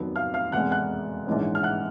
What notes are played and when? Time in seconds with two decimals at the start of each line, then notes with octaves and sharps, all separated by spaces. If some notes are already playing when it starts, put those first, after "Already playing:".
Already playing: F1 D#2 D#3 F#3 B3
0.16 F5 F6
0.34 F5 F6
0.52 F1 E2 B2 G#3 F#5 F#6
0.71 F#5 F#6
1.27 A#1 G#2 E3 G#3 C#4
1.55 F6
1.63 F#5 F#6